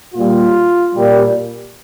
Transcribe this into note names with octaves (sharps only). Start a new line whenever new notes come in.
A#2 G3 F4
A#2 G3